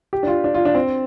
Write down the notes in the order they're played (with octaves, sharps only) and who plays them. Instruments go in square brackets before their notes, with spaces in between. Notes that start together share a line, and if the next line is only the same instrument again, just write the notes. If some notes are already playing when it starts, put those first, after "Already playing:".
[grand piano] G4
D4
F4
D4
F4
D4
C4